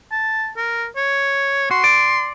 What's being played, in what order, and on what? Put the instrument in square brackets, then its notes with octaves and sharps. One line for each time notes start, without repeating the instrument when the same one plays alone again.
[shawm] A5
A#4
C#5
[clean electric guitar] F#4 [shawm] C6
[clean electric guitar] D5